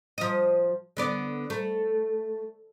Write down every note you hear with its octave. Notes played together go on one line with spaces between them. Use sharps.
F3 D#5
D3 B3 D5
A3